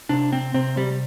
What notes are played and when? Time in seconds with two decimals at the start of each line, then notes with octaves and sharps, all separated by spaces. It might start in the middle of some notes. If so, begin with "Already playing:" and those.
0.09 C3 D4
0.32 C4
0.54 C3 C4
0.77 G3